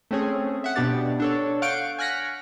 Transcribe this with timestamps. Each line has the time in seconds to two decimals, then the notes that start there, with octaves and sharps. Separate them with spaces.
0.11 A3 C4 C#4 G#4
0.64 E5 F#5
0.76 B2 B3 D4 G4 D5 A6
1.20 D4 A4 C#5
1.62 F5 F#5 C#6 G6 D7
1.99 G#5 F6 F#6 A#6 B6 C#7